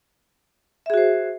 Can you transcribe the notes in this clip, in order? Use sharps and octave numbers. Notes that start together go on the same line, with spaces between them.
F#4 G#4 C5 E5